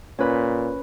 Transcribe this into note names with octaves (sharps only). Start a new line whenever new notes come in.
A#2 C#4 B4